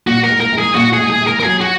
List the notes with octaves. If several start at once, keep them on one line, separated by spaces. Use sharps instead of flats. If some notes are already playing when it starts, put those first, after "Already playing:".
A#2 F#4
A#4
G#3
A#4
G#3
G#4
A#2 F#4
G#3 G#4
G#4
G#3
A#4
A#4
F#3 G#4
F#4